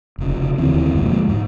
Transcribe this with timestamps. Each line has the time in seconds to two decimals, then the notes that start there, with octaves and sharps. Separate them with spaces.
0.18 F1 C#3
0.58 D#2 D3 E3 C4
0.95 F2 B2 G#3 A#3
1.28 G#2